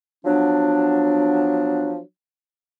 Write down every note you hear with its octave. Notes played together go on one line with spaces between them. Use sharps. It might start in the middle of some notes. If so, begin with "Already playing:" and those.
F3 F#3 B3 D4